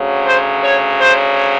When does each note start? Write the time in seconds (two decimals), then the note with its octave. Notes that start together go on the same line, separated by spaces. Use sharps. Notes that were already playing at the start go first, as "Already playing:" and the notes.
Already playing: D2 C#3 F#3
0.26 C5
0.64 C#5
1.01 C5